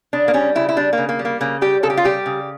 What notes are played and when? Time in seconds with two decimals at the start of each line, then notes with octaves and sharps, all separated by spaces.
0.13 C#3 D4
0.28 A#3
0.34 G3 C#4
0.55 C#3 E4
0.69 E4
0.77 G3 D4
0.93 C#3 A#3
1.09 A#3
1.19 G3
1.25 A#3
1.41 C#3 A#3
1.61 G3 G4
1.83 C#3 A4
1.90 G4
1.97 F4
2.04 G3 G4
2.26 C#3